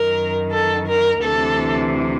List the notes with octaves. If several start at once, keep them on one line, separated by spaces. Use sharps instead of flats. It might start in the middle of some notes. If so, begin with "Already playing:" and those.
Already playing: F#2 D#3 A#4
A4
A#4
D2 C3 E3 A4